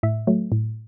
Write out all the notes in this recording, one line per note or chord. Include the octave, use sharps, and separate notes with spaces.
A2 E5
F#3 A3
A2